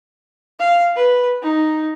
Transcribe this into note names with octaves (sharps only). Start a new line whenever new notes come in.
F5
B4
D#4